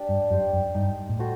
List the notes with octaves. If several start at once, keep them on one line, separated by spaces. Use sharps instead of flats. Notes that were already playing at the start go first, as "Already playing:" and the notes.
Already playing: D4 G4
G2
F#2 G4 C5
F#2
G2 D#4
A2
F#4 A4 C5